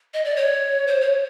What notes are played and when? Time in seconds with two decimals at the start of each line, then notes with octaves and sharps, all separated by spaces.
0.14 D#5
0.25 D5
0.36 C#5
0.87 C5
1.01 C#5